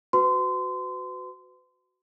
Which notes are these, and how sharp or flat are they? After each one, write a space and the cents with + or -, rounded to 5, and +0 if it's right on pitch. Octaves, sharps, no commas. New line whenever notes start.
F#4 +0 B4 +35 C6 -25